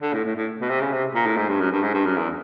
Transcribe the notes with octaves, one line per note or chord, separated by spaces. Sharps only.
D3
A2
A2
A2
B2
C3
C#3
C3
A#2
A2
G#2
G2
F#2
G2
G#2
G2
F#2
E2